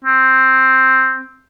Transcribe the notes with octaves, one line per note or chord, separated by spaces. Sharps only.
C4